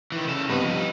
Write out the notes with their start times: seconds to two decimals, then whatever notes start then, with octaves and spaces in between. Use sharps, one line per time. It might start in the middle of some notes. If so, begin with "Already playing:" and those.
0.12 D#3 E3
0.27 C#3 A4
0.49 G2 B3 C4 D#4 B4
0.63 F3 G3